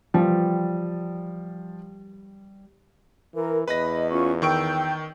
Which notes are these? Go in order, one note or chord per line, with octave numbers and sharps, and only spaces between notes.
F3 G3
E3 A#4
E2 B4 D#5 B5 A#6
C#4 F4 C#6
D#3 G5 C#6 E6 G6 D7